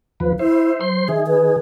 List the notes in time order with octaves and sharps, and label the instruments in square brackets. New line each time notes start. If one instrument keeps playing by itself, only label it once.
[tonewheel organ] D#2 F3 B4
[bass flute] E4 [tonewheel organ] C5 E5
[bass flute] F#3 [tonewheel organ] C5 C6
[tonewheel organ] D#3 G#4 [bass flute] E5
[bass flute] B4